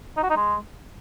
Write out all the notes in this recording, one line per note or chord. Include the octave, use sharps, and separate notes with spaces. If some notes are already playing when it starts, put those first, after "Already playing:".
D#4
F#4
D#4
G#3